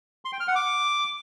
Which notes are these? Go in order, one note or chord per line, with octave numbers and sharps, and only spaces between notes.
C6
G5
F6
F#5
D6